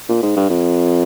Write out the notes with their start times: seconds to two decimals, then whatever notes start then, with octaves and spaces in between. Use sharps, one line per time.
0.09 A#2
0.23 G#2
0.36 G2
0.50 F2